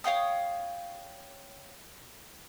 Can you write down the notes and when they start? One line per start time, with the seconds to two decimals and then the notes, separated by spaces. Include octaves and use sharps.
0.04 C#5 F5 G5 D#6